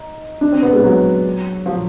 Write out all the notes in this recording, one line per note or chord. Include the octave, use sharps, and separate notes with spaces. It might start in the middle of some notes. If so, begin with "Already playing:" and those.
Already playing: D#4
D4
C4
B3
G#3
F#3
F3